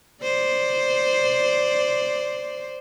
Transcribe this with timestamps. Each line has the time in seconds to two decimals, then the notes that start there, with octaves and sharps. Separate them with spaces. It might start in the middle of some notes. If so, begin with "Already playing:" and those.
0.23 C5 D5